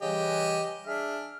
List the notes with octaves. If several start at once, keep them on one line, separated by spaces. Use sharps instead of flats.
C#3 E3 G3 G4 D#5 G#5
D4 G#4 E5 F6